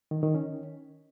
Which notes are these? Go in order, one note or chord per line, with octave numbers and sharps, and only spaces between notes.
D#3
D#3
C#4